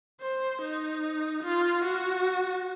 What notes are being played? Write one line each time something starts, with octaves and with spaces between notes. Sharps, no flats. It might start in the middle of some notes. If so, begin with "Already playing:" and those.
C5
D#4
F4
F#4